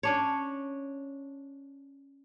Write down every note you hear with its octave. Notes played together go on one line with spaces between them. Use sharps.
C#4 D4 C#5